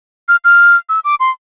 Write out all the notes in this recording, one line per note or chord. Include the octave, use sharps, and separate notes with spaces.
F6
F6
E6
D6
C6